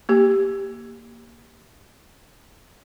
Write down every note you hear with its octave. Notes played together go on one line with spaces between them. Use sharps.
A#3 G4